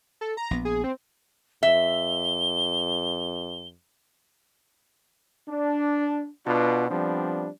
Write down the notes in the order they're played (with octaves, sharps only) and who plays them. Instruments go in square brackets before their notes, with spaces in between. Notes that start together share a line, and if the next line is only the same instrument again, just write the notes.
[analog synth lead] A4
A#5
[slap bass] A#1 B3
[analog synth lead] G#4
C4
[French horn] F2 [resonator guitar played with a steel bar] E5 [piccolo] G7
[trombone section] D4
B2 B3 D4 F4 B4
F3 G3 B3 C4 D4